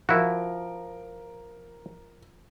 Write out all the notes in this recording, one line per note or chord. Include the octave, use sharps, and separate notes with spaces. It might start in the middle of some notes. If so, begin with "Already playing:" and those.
F3 E4 F#4 A#4